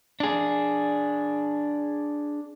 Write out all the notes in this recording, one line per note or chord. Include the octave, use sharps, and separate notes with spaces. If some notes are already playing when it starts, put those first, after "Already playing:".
D4 G#4